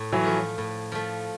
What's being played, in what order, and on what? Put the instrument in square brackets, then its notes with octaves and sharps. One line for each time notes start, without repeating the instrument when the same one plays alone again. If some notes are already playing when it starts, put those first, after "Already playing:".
Already playing: [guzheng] A2 A3
[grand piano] E3 F#3
[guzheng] F3 A3
A2
F3 A3